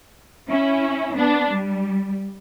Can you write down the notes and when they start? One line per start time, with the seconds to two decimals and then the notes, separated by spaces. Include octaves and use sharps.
0.49 C#4 E4
1.16 B3 D4
1.51 G3